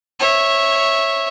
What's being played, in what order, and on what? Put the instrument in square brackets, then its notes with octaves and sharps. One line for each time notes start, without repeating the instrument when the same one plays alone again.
[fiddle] C#5 E5